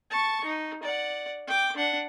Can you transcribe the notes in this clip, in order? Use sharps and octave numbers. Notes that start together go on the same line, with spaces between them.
A5 C#6
D#4
D5 F#5
G5 D6
D4 F#5